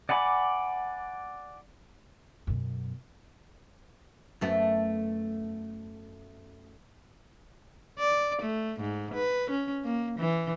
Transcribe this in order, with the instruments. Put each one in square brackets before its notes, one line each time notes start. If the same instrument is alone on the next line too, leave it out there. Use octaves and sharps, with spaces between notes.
[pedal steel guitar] D5 F#5 G#5 B5 D6
[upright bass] F#2 B2
[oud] F#2 A3 B3
[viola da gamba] D5
A3
G#2
B4
C#4
A#3
E3